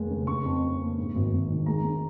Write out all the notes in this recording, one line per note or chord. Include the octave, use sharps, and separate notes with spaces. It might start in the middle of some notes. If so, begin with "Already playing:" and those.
Already playing: F1 D#2 G#3
C#3
C#3 C#6
F2
F2
A#3
G#2
G#1
G#1
D#3
G#3 A#5
G#2